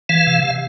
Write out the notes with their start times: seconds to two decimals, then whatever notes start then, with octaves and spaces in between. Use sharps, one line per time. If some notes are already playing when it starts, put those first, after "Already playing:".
0.09 E3 F5
0.27 C3
0.43 C3